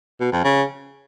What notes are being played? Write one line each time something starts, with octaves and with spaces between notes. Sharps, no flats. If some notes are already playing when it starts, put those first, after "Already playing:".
B2
F2
C#3